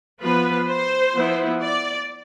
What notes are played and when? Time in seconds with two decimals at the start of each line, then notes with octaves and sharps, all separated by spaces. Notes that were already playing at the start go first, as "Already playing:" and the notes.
0.21 F3 B3 F4 B4
0.68 C5
1.15 F3 B3 E4
1.62 D5